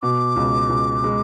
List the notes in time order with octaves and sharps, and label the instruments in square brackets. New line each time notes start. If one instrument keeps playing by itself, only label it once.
[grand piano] B2 [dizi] D6
[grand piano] C#2
C#2
G#3